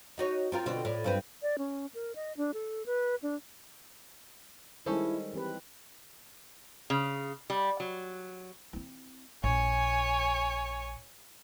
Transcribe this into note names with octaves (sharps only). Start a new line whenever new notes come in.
D#4 F#4 C#5
C4 F4 A#4
B2 D3 C4
A2 D5
G2 C4 B4
D5
C#4
A#4
D#5
D4
A4
B4
D4
D#3 G3 G#3 C#4 E4 A4 C5
E3 C4 G4 B4
C#3
G3
F#3
C4 E4
A#1 C#5 G#5